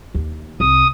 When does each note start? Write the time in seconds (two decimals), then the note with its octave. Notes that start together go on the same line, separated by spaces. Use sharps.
0.14 D#2
0.60 C2 D#6